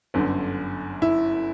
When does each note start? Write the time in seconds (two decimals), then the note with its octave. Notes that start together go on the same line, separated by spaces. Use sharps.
0.14 G1 F#2 D3
1.02 E4